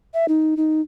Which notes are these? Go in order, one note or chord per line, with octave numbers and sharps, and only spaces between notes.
E5
D#4
D#4